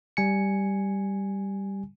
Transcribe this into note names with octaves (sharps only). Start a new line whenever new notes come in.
G3 G#5 C#7